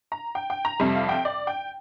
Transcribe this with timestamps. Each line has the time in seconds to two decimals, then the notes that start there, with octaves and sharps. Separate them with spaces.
0.12 A#5
0.35 G5
0.50 G5
0.65 A#5
0.80 F2 C3 G3
0.95 F5
1.09 G5
1.25 D5
1.47 G5